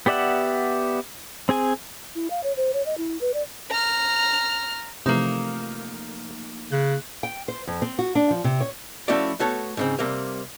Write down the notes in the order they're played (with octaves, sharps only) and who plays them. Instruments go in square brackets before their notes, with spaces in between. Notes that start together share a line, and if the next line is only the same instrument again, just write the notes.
[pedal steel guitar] B3 G4 D5 E5 F#5
C4 G#4 G#5
[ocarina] E4
F5
C#5
C5
C#5
D#5
E4
B4
D5
[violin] A#5 F6
[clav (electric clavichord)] C3 E3 [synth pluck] F3 A3 E7 [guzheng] A#3 D#4
[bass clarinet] C#3 [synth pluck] F#6
[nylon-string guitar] G5
C5
F2
C4
F#4
D4
F3
C3
C#5
[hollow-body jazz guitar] F3 A3 C#4 E4 F#4 D5
A3 B3 F#4 A4 C#5
G#2 C#3 C4
C3 G3 A#3